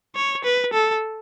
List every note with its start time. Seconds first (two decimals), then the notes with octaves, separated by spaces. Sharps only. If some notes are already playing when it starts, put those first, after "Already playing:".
0.16 C#5
0.44 B4
0.73 A4